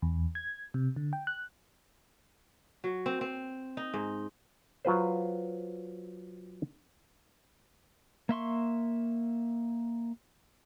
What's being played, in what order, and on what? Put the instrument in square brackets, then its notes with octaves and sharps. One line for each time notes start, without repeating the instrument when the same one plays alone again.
[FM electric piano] E2
G#6
C3
D3
G5
F#6
[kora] F#3
C4
C4
D#4
G#2
[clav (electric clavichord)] F#3 F4 B4 C5
[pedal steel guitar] A#3 E5 C6 C#6